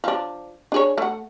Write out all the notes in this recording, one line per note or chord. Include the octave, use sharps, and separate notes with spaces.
F3 D4
D4 G#4 C#5
A3 F#5